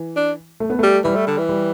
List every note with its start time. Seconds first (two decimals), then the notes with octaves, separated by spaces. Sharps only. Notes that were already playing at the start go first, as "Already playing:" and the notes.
Already playing: E3
0.16 D4
0.60 A3
0.70 B3
0.79 G3 A3
1.04 E3 G3
1.15 A3
1.27 D3
1.38 E3
1.49 G3